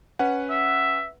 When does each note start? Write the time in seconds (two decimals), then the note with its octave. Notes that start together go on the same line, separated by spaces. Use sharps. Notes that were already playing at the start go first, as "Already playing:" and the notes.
0.19 C#4 B4 F#5
0.50 E5